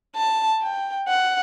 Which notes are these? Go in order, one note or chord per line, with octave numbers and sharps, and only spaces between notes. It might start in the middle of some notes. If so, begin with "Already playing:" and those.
A5
G5
F#5